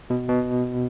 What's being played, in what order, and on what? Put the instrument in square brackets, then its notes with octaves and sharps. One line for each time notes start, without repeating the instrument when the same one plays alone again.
[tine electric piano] B2
B2